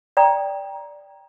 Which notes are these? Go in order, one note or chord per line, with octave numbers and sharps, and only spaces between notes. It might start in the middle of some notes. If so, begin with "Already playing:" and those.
D5 G5 A#5